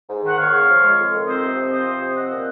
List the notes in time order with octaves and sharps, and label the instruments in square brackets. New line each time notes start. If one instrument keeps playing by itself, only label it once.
[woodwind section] G#2
D#3 F#5
A#3 C#5 F5
C#3
F3
G#3
F2
D#3
C4 C5 D#5
C3
F3
C4 C5 D#5
C3
F3
C4 D#5 F#5
A#2